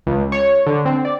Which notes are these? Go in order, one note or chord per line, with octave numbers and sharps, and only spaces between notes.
C#2
C#5
D3
C4
D5